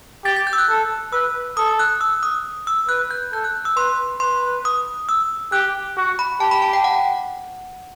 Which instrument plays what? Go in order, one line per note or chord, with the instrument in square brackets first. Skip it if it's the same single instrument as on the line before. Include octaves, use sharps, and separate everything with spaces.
[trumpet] G4 [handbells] A6
[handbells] A6
G6
E6
F#6
[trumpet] A4
[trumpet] B4 [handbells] E6
[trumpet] A4 [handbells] D#6
[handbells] F#6
E6
D#6
E6
[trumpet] B4 [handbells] F#6
[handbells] G6
[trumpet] A4 [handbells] G6
[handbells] F#6
E6
[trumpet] B4 [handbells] C6
[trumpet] B4 [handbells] C6
[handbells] D#6
E6
[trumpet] G4 [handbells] F#6
[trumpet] F#4
[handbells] B5
[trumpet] G4 [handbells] A5
[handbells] B5
A5
G5
F#5